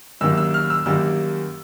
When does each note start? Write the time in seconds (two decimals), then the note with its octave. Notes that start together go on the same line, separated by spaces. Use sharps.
0.21 F#2 D#3 G3 A#3 E6
0.37 E6
0.54 F6
0.70 E6
0.86 F#2 D#3 G3 A#3 E6